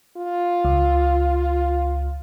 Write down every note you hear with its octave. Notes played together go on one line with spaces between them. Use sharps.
F4
C#2